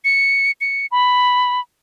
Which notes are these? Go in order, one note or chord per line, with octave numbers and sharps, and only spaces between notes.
C#7
C#7
B5